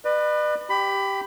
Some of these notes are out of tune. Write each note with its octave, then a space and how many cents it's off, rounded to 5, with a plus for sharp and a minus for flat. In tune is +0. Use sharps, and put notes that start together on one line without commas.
B4 +0 D5 +45
G4 +0 B5 +20